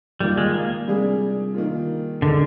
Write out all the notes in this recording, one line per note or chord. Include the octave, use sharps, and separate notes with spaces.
D#3 G3 A#3 F4 A#4
G#3
A#3
C3 G3 D4 G#4
D#3 A#3 F4
D3 G#3 D#4 A#4